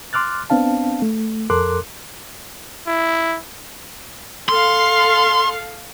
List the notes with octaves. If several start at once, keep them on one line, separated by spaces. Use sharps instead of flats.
C6 D6 F6 F#6 A6
B3 C4 D4 F5 A5
A3
F2 A4 A#4 C6 D6 F#6
E4
A4 F5 C6